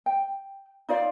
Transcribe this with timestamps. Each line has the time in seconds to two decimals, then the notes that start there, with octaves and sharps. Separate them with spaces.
0.06 G5
0.89 D#4 F4 D5 F5